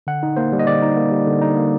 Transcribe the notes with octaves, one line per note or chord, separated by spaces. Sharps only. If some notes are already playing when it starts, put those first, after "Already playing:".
D3 F#5
D#4
A#3 C5
G3
D#5
D3 D5
D#4
A#3
G3
D3
D#4
A#3